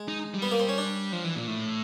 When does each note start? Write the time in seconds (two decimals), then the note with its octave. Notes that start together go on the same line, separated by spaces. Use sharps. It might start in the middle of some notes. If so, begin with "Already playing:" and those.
Already playing: G#3
0.08 D#4
0.34 G3
0.42 B3
0.52 A#3
0.60 C4
0.69 C#4
0.78 D4
1.12 F3
1.24 E3
1.36 A#2
1.47 A2